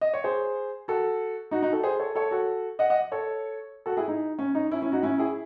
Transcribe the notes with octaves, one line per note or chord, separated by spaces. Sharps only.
D#5
C#5
G#4 C5
F#4 A4
D#4 F#4
D#4 F#4
F#4 A4
G#4 C5
A4 C#5
A4 C#5
F#4 A4
D#5 F#5
D#5 F#5
A4 C#5
F#4 A4
E4 G#4
D#4
C#4
D#4
C#4 E4
C#4 E4
D#4 F#4
C#4 E4
E4 G#4